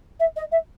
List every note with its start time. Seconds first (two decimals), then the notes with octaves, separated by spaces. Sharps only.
0.20 E5
0.36 D#5
0.52 E5